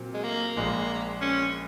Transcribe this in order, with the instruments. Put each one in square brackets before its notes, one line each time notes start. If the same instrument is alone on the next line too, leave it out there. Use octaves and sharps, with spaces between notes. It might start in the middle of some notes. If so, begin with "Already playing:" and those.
Already playing: [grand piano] A#2 F#3 C4
[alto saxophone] G#3
A#3
[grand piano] A#1 A#2 G#3 [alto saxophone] A#3
[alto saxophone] C#4